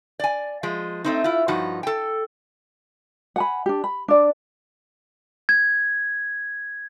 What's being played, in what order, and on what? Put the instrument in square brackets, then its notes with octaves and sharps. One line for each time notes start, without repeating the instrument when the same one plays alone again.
[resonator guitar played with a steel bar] D5 G#5
F3 G#3
A3 C4 D#4
E4 F4
G2 F3 D#4 F#4
A4 G5
[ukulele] F#5 G#5 B5
D4 G4
B5
D4 D5
[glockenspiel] G#6